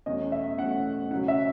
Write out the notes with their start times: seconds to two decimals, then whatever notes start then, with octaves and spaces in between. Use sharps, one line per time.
0.06 E2 B2 A3 C#4 D#5
0.32 E5
0.58 E2 B2 A3 C#4 F#5
1.11 C#3 F#3 C#4 F#5
1.28 E5